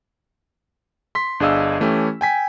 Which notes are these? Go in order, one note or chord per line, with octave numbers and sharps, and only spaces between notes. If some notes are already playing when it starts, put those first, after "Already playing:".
C6 B6
G1 D4 G#4 D#5 F5 E6
E3 A3 C#4 E4 G4
G5 G#5 B6